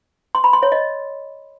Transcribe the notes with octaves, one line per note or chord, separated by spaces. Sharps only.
C6
B5
C6
C#5
D#5